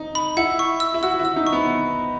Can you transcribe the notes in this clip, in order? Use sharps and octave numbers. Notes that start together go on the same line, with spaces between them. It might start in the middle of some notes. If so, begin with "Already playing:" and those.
Already playing: D#4
B5
E4 F#5
C#6
E6
E4
F#4 E6
E4
E6
D#4
C#6
B3